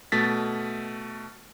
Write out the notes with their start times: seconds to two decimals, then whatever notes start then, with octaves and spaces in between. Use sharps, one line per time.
0.12 B2 A3 A6 B6